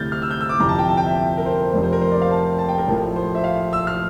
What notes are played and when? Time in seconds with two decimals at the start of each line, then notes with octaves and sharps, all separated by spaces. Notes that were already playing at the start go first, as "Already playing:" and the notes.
Already playing: D2 C3 E3 G3 F6 G6 A6
0.12 F6
0.22 E6
0.31 G6
0.41 E6
0.49 D6
0.59 G1 F2 C3 E3 A#5
0.69 A5
0.79 G5
0.88 A5
0.97 G5
1.07 E5
1.38 A#4
1.46 C5
1.73 F1 F2 C3 C5
1.83 C5
1.93 A#4
2.01 C5
2.12 D5
2.22 F5
2.31 A5
2.58 A5
2.69 G5
2.78 A#4
2.88 A1 A2 F3 A3
3.16 C5
3.35 E5
3.44 F5
3.73 E6
3.87 F6